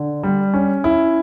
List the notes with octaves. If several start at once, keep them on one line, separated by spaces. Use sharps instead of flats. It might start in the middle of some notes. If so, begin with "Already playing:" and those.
Already playing: D3
G3
C#4
E4